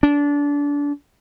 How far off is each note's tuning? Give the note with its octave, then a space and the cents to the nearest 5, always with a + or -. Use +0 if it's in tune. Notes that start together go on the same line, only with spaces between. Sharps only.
D4 -25